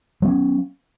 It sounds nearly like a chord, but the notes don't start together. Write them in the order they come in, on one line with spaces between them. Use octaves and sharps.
F#3 B3 C#4